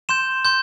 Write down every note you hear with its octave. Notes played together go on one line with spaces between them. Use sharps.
C6 G6 E7
C6 G6